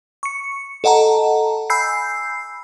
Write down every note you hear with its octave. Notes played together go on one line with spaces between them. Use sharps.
C#6 C#7
A4 D#5 F#5 A5 A#5
G#5 B5 E6 G6 C7